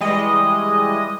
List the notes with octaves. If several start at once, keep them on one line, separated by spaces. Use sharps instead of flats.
E3 G3 G#3 D#5